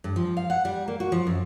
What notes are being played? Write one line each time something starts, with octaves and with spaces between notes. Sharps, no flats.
G2
F3
F5
F#5
G3
A#3
F#4
F3
F#2